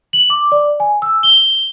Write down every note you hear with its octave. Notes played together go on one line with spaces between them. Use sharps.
F#7
D6
D5
G#5
E6
G7